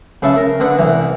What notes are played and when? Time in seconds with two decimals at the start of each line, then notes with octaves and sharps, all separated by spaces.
0.22 C#3 B4 E5 A5
0.36 A#4
0.60 D3 B3
0.78 C2 E3